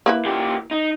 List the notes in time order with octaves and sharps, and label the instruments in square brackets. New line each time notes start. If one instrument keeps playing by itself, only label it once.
[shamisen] A#3 E4 B4
[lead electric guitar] A#2 G4
D#4